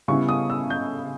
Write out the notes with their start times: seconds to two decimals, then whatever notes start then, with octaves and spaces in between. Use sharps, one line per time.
0.08 C#3 G3 B3 E4 C#6
0.29 D#6
0.50 E6
0.70 G6